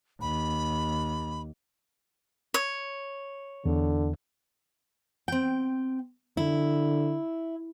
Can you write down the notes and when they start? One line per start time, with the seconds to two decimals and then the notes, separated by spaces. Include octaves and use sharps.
0.21 D#2 B5
2.54 C#5
3.66 E2 D3
5.28 C4 G5
6.37 D3 E4